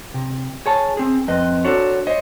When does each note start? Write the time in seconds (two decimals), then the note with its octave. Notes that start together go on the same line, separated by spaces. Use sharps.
0.14 C3
0.66 G#4 C#5 A5
0.97 C4 G#4
1.28 F2 C4 B4 D#5
1.65 D4 F#4 A4 C5 C#5
2.07 C5 C#5 D#5